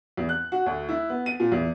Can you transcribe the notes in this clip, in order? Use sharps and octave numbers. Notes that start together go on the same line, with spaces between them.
E2
F#6
F#4
D2
E4
B3
D#7
A#2
E2